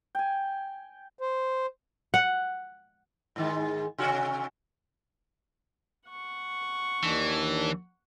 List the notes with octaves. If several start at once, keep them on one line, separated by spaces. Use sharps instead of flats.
G5 G#5
C5
F#5
G#2 D#3 G#3
C3 C#4 F#4
F#5 C#6
D#2 D#3 E3 D4